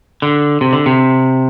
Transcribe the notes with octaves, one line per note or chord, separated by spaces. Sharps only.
D3
C3
D3
C3